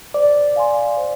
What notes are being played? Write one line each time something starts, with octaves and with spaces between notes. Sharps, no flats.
C5 D5
F5 G#5 C6
C5